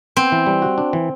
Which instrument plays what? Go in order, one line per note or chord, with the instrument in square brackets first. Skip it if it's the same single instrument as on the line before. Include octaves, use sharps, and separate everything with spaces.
[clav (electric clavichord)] B3 [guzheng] C4
[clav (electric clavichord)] E3
G3
F#4
D4
E3